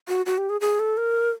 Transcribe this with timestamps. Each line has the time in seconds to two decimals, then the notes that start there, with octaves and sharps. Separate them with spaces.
0.08 F#4
0.26 F#4
0.38 G4
0.49 G#4
0.61 G#4
0.79 A4
0.97 A#4